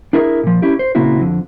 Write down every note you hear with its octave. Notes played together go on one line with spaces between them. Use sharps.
D4 E4 G#4 A#4 C5 E5
A#2 F3
C#4 E4 G4
C5
A#2 C#3 A#3 C4 E4 F#4
F2 D3